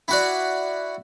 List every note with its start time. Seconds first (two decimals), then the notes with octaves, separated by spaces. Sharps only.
0.08 E4 F#4 D5